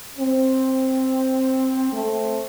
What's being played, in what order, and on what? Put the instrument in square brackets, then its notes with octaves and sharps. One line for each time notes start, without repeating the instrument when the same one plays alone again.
[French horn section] C4
A3 C4